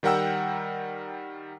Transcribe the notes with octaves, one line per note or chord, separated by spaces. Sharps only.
D#3 G3 A#4 F#5 G5 E6